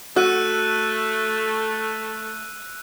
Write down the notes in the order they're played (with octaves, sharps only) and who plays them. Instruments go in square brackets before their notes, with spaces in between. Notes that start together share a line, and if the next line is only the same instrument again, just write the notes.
[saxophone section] A3 [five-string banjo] F#4 [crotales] E6 F#6 D#7